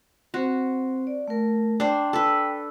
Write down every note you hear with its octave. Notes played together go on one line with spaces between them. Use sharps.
C4 F#4 C5
D5
A3 A#4
D4 C5 G5
A4 B4